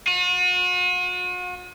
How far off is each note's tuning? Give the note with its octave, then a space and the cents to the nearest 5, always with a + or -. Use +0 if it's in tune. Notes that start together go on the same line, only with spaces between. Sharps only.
F#4 -45